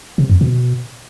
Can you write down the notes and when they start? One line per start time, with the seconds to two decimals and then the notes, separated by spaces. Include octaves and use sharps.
0.18 C3
0.30 F2
0.41 B2